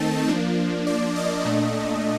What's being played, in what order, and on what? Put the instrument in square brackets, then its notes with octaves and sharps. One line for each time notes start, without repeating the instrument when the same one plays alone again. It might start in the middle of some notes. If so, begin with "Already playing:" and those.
Already playing: [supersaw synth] D#3 A3 C4 D#4 A5
F3 A#3 D4
D5
D#5
A#2 A3 D4